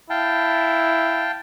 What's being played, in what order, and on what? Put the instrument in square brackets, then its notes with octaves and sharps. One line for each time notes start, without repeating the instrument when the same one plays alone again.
[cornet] E4 [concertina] F5 G5 A5